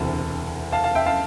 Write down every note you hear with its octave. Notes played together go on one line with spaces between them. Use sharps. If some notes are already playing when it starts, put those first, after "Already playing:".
Already playing: E1 D2 C3 E3 A5
F5 A5
F5 A5
E5 G5
F5 A5